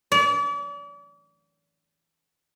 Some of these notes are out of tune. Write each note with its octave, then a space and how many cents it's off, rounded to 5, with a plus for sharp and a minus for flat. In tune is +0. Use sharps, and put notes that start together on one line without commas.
D5 -40